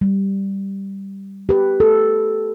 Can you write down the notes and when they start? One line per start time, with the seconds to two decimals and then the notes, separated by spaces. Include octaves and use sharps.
0.01 G3
1.49 G4 B4
1.80 A4